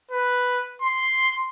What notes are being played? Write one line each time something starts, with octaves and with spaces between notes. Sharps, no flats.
B4
C6